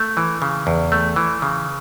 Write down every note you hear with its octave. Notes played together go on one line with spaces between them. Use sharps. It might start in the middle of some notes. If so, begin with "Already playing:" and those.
Already playing: A3
E3
C#3
E2
A3
E3
C#3